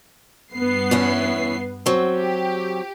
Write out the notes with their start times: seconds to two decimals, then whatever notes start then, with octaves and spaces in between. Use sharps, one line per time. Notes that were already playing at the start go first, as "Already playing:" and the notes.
0.55 G2 B3 C7
0.91 E2 C#4 E4
1.86 F#3 C4
2.17 G4